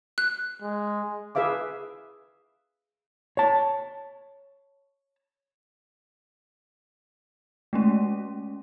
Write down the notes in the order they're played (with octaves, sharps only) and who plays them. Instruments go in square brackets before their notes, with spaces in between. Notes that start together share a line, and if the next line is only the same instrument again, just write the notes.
[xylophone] F#6
[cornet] G#3
[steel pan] G#4 B4 E5 F5 D6
[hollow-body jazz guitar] C#5 A5
[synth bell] G#3 A3 C#4